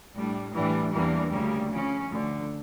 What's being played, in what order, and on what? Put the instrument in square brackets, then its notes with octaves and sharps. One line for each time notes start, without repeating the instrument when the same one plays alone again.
[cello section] A2 G3 D4
A2 E3 G3 D4
E2 E3 G3 A#3 D4
D2 C#3 G3 A#3
C#3 F3 C#4
D2 D3 F3